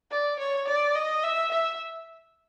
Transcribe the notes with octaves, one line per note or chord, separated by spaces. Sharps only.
D5
C#5
D5
D#5
E5
E5